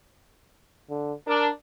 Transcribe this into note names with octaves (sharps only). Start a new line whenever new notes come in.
D3
D4 A#4